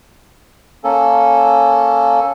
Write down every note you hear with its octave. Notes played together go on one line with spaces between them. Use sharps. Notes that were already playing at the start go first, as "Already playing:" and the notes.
A#3 C#4 A4